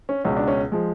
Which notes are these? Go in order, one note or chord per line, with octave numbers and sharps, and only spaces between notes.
C#4
C#2 B2 G#3 C#4
D4
C#4
F3 G#3